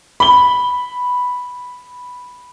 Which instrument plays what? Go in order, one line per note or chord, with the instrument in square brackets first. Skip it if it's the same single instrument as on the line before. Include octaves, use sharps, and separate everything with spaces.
[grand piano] B5 G7